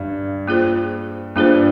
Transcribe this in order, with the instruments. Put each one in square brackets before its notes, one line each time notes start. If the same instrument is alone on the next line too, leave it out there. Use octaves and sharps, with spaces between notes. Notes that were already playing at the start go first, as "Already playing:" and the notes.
Already playing: [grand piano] G2
[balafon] A#3 F4 G#4 C5
[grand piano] G2 [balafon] A#3 F4 G#4 C5